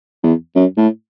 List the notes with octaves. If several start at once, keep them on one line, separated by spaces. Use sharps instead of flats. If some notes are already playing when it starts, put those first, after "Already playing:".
E2
F#2
A2